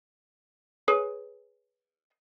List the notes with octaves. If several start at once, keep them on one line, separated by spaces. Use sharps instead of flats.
G#4 B4 C#5